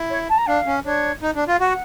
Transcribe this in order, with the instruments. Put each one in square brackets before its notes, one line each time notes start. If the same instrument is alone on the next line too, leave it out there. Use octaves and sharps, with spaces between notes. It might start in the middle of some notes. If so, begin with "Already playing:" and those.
Already playing: [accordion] E4
[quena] C#5
A5
A#5
[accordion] D4 [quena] F5
[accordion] C#4
[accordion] D4 [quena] C#5
[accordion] D#4
D4
[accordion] F4 [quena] F5
[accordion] F#4 [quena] F#5